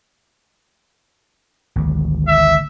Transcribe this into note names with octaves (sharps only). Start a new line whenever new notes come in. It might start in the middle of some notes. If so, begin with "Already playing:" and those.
G#1 D2
E5